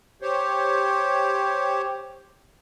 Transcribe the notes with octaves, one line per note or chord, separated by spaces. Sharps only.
G4 C5 C#5